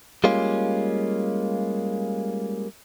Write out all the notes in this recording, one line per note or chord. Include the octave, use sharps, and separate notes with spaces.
G3 G#3 A#3 C#4 F4